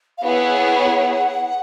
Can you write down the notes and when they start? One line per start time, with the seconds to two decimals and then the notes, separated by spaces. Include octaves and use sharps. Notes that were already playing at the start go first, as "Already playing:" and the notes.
0.18 F5
0.23 B3 E4 G#4 C#5 F#5